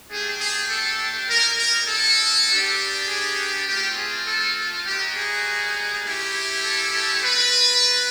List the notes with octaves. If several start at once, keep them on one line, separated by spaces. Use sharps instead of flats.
A3 D4 G4 G#4
G#4
A4
G3 A#3 D#4 A#4
A#4
A4
G3 B3 D4 G4
G#4
A3 C4 F4 G4
G#4
A4
G3 A#3 D#4 F#4 G4
G#4
A3 C#4 E4 G4
A4
A4
C4 F4 B4